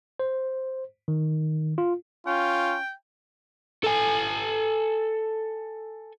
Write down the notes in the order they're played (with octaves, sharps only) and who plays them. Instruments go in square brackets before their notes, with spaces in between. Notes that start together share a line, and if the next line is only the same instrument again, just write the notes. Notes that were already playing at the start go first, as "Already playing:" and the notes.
[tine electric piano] C5
D#3
F4
[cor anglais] C#4 [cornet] F4 [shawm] G5
[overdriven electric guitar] A4 G#5